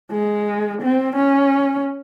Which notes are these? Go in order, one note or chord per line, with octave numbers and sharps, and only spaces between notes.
G#3
C4
C#4